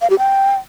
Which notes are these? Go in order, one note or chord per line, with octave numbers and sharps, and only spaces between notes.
F5
G4
G5